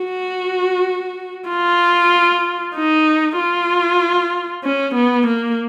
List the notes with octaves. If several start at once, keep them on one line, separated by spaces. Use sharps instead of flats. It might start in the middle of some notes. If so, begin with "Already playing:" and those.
Already playing: F#4
F4
D#4
F4
C#4
B3
A#3